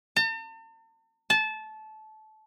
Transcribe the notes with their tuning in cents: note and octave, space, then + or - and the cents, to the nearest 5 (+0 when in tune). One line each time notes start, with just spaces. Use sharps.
A5 +45
A5 -20